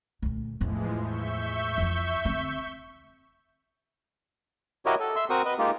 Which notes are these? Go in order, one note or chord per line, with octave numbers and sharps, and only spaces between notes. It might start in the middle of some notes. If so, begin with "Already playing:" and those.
D2 A#2
E2 A2 E3 F3 G#3
E5 C#6 G6
F2 E3
D3 C4
E4 F#4 G4 A#4 C#5 D#5
A4
E5 C6 E6
C4 F#4 A#4 C5 C#6 D#6
B4 D#5
G#3 A#3 D#4 F4 G4